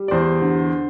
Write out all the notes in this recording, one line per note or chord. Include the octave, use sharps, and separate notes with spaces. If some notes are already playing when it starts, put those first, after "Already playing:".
Already playing: G3
D5
E2 C5
D3